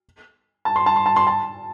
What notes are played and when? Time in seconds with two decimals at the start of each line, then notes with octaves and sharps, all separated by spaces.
0.65 A5
0.76 C6
0.86 A5
0.96 C6
1.06 A5
1.16 C6
1.27 A5